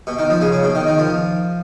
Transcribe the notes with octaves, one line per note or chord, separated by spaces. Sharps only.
B2
D#3
F3
C#3
C#3
B2
D#3
D#3
F3